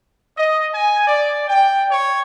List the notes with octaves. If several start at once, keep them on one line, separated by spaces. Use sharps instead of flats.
D#5
G#5
D5
G5
C#5